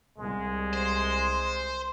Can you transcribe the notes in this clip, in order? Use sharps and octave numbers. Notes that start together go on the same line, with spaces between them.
C2 G#3
C5